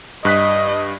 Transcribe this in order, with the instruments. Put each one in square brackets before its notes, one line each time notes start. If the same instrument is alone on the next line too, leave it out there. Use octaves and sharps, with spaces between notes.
[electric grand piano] G2 F#6 B6 [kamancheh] D#5